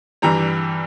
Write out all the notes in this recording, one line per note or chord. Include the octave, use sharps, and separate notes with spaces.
G2 E3 G3 A#5